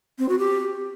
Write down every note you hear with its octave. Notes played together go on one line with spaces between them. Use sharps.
C4
F#4
G4